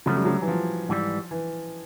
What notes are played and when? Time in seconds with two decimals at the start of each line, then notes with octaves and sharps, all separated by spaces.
0.06 C#3 F3 F#3 A3
0.16 G3
0.25 F#3
0.42 E3
0.48 F3
0.89 G#2 E3 G3
1.31 E3